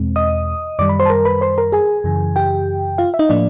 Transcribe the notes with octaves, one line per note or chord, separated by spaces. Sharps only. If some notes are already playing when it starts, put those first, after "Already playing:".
Already playing: E2 B2 G#3 C4
D#5 D#6
F#2 D#3 G3 D5 D6
B5
C5 C6
A5
A#4 A#5
B4 B5
C5 C6
A#4 A#5
G#4 G#5
F#2 C#3 E3
G4 G5
F4 F5
E5
D#4 D#5
A2 F3 A#3 D4 D5